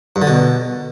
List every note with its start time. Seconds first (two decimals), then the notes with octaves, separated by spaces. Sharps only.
0.16 G2
0.22 D3
0.27 B2